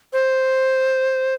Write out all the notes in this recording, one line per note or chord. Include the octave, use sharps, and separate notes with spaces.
C5